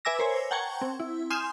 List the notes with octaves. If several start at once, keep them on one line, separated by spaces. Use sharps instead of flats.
B4 E5 G#5 D6 E6 A#6
A#4 C5 C#5 G#5
F#5 G5 A5 A#5 C#6 G#6
C4
E4
G#5 C6 D#6 F6 G6 E7